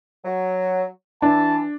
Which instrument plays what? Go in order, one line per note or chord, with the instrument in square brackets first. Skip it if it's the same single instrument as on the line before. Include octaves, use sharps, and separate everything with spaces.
[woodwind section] F#3
[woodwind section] E3 [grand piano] D4 [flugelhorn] A5